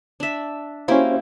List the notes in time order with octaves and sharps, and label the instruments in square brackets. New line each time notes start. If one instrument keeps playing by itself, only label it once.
[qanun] D4 E5
[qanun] A#3 E4 G4 [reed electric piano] C#4 F#4 C5